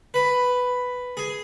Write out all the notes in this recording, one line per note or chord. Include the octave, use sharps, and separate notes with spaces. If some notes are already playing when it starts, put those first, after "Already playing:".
B4
G#4